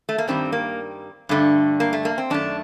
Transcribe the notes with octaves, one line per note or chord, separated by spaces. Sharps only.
A3
A#3
G2 D#3 G3 C4
A#3
G2 D3 A3
A#3
A3
A#3
C4
F#2 D#3 A3 D4